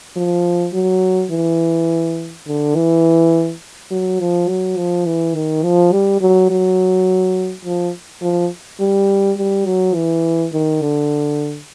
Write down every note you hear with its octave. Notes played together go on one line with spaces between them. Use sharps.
F3
F#3
E3
D3
E3
F#3
F3
F#3
F3
E3
D#3
F3
G3
F#3
F#3
F3
F3
G3
G3
F#3
E3
D#3
D3